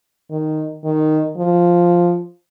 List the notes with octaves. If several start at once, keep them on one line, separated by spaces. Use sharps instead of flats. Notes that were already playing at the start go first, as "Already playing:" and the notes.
D#3
D#3
F3